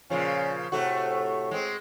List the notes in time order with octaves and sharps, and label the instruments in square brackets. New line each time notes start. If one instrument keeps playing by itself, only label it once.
[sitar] A#2 C#3 F3 [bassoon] C#4
[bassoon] A2 [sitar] C3 A3 F#4
[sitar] G#3 C4